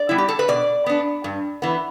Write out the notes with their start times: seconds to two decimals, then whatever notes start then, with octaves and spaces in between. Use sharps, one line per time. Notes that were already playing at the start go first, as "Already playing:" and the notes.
Already playing: D5
0.09 G3 B3 E4
0.18 G4
0.29 A4
0.39 B4
0.48 B2 D5
0.86 B3 D4
1.24 G2
1.62 E3 B3